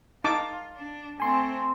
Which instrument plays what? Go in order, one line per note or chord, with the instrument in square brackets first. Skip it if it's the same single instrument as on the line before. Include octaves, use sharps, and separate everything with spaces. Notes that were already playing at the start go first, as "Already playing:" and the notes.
[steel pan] D#4 A5 D6 [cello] F4
[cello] D4
[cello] A3 C4 [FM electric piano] G#5 C6